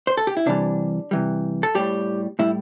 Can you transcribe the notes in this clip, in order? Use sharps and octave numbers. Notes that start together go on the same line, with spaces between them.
C5
A4
G4
E4
C3 E3 G3 D4
C3 E3 G3
A4
A2 G3 G4
A2 G3 E4